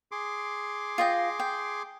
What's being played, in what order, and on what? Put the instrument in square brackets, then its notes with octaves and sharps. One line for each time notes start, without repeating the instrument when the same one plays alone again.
[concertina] G#4 C6 D6
[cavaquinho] F4 D#5 G5
G5